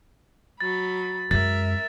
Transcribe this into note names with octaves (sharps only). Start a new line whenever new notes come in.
F#3 B5 A6
F#2 G#3 A#4 E5 A6